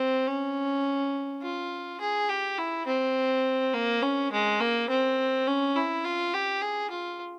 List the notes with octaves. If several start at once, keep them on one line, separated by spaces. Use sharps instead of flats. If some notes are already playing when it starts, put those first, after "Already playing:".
Already playing: C4
C#4
F4
G#4
G4
E4
C4
A#3
C#4
G#3
A#3
C4
C#4
E4
F4
G4
G#4
F4